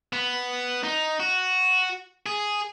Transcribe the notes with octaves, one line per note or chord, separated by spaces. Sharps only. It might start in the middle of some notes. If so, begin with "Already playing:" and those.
B3
D#4
F#4
G#4